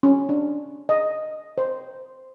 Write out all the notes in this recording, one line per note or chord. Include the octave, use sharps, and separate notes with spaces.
C#4
D4
D#5
C5